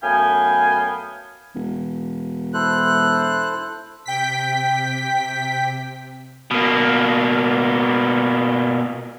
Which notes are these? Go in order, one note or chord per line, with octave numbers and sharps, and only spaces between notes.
F#2 A3 B3 F5 G5 G#5
E1
E4 A4 C5 F#6
C3 G5 B6
B2 A#3